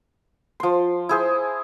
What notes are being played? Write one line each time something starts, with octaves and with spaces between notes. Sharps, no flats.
F3 C6
E4 G#4 C5